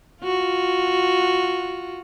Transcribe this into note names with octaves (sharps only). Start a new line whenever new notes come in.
F4 F#4